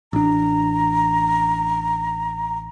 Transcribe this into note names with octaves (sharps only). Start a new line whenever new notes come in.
A1 D4 A#5